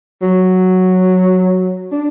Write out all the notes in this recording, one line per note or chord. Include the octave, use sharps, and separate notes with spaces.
F#3
D4